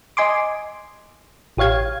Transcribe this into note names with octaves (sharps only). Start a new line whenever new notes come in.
D#5 G#5 C6 D6
A1 G4 C#5 F5 G#6